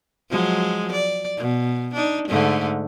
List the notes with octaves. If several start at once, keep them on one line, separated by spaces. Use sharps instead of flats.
F3 F#3 G#3
D5
B2
D4 D#4
G#2 D3 A3